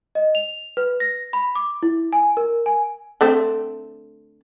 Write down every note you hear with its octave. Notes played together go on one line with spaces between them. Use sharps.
D#5
F7
B4
A#6
B5
D6
E4
G#5
A#4
G#5
D3 A3 C4